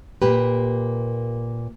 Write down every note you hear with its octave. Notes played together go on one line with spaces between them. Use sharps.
A#2 A#3 G4 B4